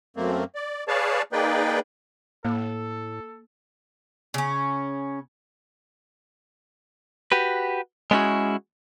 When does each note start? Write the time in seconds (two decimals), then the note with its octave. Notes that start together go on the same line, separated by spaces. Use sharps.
0.17 F#2 A3 A#3 C4
0.55 D5
0.88 G#4 B4 C#5 D5 F5 A5
1.32 A#3 D#4 G#4 B4 D5 G5
2.45 A2 A#3 A4
4.34 C#3 C#4
7.32 F#4 G4 B4
8.11 G#3 B3 C#4 E4 F#4 G#4